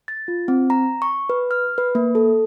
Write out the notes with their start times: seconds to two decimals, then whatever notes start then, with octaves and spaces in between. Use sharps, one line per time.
0.08 A6
0.28 F4
0.48 C4
0.70 A#5
1.02 C#6
1.29 B4
1.51 F6
1.78 B4
1.95 A#3
2.15 A4